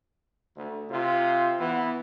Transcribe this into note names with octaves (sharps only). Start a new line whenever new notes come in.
D2
C3 F4
E3 B3